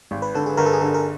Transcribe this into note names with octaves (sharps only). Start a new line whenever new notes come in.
G#1
B4
D3 A4
G#4
G1 A#4
A4
G#4
D3 A4
A#4